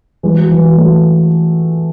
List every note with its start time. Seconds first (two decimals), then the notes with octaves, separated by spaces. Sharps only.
0.23 E3 G#3
0.37 F#3
0.51 E3
0.65 F#3
0.78 F#3 A3